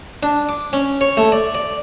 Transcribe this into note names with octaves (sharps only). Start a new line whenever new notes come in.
D4
D6
C#4
C#5
A3
D5
D5